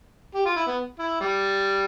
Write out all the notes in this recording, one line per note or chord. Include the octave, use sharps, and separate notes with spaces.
G4
F4
E4
B3
E4
G3